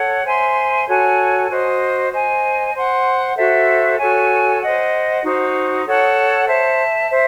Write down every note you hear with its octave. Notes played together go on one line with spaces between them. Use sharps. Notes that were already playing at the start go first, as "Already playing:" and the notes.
Already playing: A4 C#5 F#5
C5 E5 G#5 C6
F#4 A4 C#5 G#5
F#4 C5 D#5
C5 D#5 G#5
C5 F#5 C6
F#4 A4 C5 E5
F#4 A4 C#5 G#5
C5 D#5 F#5
D#4 F#4 C5
A4 C#5 F#5 A5
C5 E5 A5
C5 E5